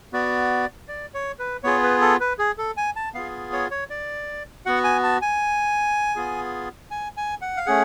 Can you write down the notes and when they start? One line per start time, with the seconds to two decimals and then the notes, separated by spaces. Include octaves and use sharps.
0.13 B3 F#4 D5
0.88 D5
1.14 C#5
1.39 B4
1.63 B3 F4 G#4 C#5
1.83 B4
2.01 A4
2.20 B4
2.39 G#4
2.58 A4
2.77 G#5
2.96 A5
3.14 B3 F4 G#4 F5
3.53 C#5
3.71 C#5
3.90 D5
4.66 B3 F#4 F#5
4.84 G#5
5.04 A5
5.22 G#5
6.16 B3 F4 G#4
6.91 G#5
7.17 G#5
7.42 F#5
7.57 F5
7.66 A3 C#4 G#4 F#5